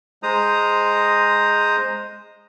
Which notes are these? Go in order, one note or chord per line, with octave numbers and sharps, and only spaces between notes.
G#3 C5 A#5 D#6